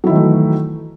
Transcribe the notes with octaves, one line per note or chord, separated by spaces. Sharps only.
D#3 E3 F#3 A3 E4